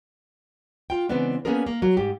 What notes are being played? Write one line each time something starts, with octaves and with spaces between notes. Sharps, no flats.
F4 G5
C#3 E3 G#3 B3 C4 D4
A#3 B3 C#4 D4 G#4 A#4
A#3
F#3
G#2 G4